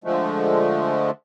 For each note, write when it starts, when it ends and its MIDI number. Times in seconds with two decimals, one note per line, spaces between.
0.04 1.11 50
0.04 1.11 53
0.04 1.11 56
0.04 1.11 57